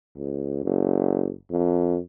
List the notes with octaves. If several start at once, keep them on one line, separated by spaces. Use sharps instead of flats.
C#2
F#1
F2